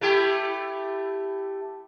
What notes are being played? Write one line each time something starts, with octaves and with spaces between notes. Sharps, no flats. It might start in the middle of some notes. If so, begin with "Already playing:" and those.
A3 E4 G4